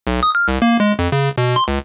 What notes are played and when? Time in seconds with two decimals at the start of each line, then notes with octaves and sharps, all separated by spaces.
0.07 B1
0.23 D#6
0.35 F6
0.48 C2
0.62 A#3
0.80 G#3
0.99 F2
1.12 C#3
1.38 B2
1.56 C6
1.68 C#2